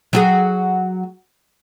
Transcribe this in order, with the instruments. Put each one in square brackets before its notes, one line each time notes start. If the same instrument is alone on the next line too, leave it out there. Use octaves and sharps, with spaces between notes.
[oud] F#3 F#4 G#4